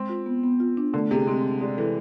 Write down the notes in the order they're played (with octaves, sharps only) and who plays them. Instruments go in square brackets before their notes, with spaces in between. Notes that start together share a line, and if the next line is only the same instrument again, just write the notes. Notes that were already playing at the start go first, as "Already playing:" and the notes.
Already playing: [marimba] G#3 [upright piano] C4
[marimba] F4
B3
B3
F4
D4
[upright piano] D3 [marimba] A3
[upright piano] C3 [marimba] G#4
[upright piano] G#3 [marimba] C4
[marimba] D4
[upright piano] G#3 [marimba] D5
[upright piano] E3 [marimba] A4